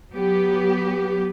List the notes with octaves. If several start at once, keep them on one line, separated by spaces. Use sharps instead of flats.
F#3 B3 G4